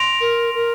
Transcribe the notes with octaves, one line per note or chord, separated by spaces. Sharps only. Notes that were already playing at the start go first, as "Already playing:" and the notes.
Already playing: C6 A#6 D7 F7
A#4
A#4